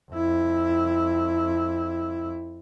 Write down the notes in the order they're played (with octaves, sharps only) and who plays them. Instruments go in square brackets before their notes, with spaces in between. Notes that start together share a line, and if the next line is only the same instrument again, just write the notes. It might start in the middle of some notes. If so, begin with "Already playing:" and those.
[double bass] F2 E4